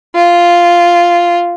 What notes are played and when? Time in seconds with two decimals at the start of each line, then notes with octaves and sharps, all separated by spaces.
0.15 F4